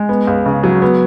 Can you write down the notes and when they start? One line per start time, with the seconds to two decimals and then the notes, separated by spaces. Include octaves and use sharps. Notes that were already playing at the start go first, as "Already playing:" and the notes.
Already playing: G#3
0.09 B3
0.27 C#2
0.46 C#3
0.64 F#3
0.82 B3